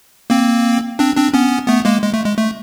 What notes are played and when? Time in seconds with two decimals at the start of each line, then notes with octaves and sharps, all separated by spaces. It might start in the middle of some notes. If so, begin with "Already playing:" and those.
0.30 A#3 C4
0.99 C4 D4
1.16 C4 D4
1.34 B3 C#4
1.68 A3 B3
1.85 G#3 A#3
2.03 G#3
2.14 A3
2.25 G#3
2.38 A3